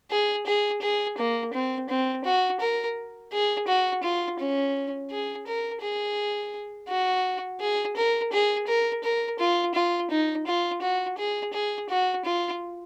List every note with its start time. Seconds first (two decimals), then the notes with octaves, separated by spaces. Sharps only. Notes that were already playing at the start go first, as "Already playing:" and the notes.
0.11 G#4
0.46 G#4
0.82 G#4
1.18 A#3
1.53 C4
1.89 C4
2.25 F#4
2.60 A#4
3.32 G#4
3.67 F#4
4.03 F4
4.39 C#4
5.11 G#4
5.47 A#4
5.82 G#4
6.89 F#4
7.60 G#4
7.97 A#4
8.33 G#4
8.67 A#4
9.04 A#4
9.39 F4
9.75 F4
10.10 D#4
10.47 F4
10.82 F#4
11.18 G#4
11.53 G#4
11.89 F#4
12.25 F4